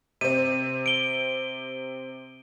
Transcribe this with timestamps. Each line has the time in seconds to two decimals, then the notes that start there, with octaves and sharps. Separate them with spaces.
0.21 C3 C4 D#7
0.86 D7 G7